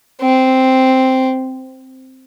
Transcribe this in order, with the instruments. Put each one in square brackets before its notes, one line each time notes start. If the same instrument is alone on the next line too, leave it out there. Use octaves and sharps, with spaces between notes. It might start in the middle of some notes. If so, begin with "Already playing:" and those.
[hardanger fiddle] C4